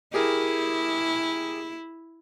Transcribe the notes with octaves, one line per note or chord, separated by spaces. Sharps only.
E4 G4 G#4 A#4